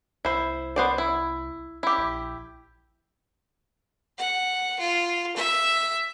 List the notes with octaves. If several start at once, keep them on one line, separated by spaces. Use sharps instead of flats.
C2 E4 C5
B3 C5 D5
E4
E4 G4
A#1
F#5
F4
E5